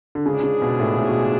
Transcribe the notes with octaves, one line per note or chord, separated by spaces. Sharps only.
D3
G#2 C#3 G#3 D4 F4 G#4
C#3
B2
A2
A2
B2